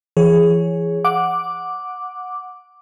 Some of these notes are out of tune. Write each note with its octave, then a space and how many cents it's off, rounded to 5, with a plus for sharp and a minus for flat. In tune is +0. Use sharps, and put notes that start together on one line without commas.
E3 +40 G#4 +0 C#5 +0
F#5 -10 D6 +0